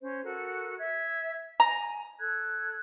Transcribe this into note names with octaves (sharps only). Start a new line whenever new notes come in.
C#4 C5
F#4 A4 A#4
E5 G#6
G#5 A#5
A4 F#6 G#6